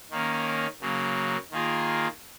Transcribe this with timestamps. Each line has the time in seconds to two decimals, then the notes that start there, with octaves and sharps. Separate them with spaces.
0.11 D#3 A#3 C#4
0.81 C#3 F#3 A#3
1.51 D#3 A#3 F4 G#4